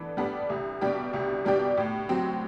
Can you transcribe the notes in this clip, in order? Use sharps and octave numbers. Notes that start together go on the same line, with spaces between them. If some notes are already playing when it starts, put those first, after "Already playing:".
Already playing: E3 B3 D4 A4
G3 B3 D4 A4
C2
B2 G3 D4 G4
C2
B2 G3 D4 G4
A2
F#3 C4